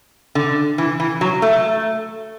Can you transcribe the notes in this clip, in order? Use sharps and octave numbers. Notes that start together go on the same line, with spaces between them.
D3
E3
E3
F#3
A3